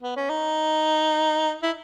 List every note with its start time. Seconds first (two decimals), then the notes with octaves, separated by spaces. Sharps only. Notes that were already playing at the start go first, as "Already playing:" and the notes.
0.03 B3
0.16 C#4
0.29 D#4
1.63 E4